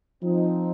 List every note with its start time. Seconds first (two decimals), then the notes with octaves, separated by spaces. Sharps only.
0.23 F3 C4 D#4